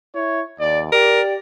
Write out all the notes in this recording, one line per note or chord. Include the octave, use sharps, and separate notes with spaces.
E4 C#5
D#2 D5
G4 A#4 D5